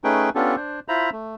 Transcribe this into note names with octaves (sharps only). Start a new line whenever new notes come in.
A3 C#4 D#4 G#4 B4 G5
B3 C#4 D4 F4 G4 A4
D4 C5
E4 F4 C5 E5 A#5 B5
A3